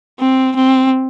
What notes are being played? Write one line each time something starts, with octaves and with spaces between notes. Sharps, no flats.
C4
C4